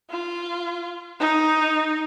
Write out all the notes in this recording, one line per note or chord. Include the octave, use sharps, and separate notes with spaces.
F4
D#4